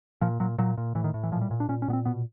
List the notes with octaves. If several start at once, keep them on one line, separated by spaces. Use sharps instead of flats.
A#2 F3
A#2 F#3
A#2 F#3
A#2
A2 E3
D#3
A2
E3
A#2 F3
G3
A#2
D4
A#2 C#4
C#4
A#2 B3
C4
B2 B3